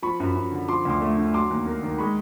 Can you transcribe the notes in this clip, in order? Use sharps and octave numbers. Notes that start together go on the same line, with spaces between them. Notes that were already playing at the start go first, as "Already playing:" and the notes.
F3 B5 C#6
F#2
F#2
D3
F3 C6 D6
D2 C6 D6
A3
D3
F#3 C6 D6
D#2
A#3
D#3
G#3 B5 C#6